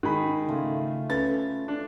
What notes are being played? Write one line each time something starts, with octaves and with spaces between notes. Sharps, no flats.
G#2 D#3 G#4 B5
C#3 A3 F4
C#4 A4 B4 A6
D4